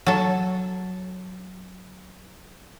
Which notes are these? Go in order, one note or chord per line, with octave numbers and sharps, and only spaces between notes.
F#3 A4